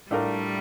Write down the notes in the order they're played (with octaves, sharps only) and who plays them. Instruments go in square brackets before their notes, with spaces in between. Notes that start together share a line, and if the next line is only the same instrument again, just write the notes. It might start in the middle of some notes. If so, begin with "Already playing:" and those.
[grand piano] A2 A3 D4 F4 A#4 [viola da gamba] G3